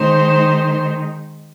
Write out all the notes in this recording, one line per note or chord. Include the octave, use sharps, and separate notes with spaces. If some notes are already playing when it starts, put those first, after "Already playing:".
Already playing: D#3 G#3 D#4 C5